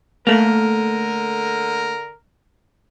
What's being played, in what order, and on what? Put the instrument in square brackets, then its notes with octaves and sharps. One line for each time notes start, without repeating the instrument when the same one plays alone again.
[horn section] D3 A#4 [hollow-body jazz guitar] A3 A#3